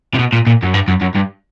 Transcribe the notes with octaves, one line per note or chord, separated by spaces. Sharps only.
C3
B2
A#2
A#2
F#2
G2
F#2
F#2
G2